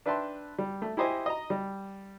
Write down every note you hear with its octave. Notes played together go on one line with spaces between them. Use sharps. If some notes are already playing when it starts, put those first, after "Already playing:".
D4 B4 E5 G5 A5 C6
G3
A3
E4 G4 C5 D#5 G#5
D#5 A#5
G3